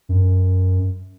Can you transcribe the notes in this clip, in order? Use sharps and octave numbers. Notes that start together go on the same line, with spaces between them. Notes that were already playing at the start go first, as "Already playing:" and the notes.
F#2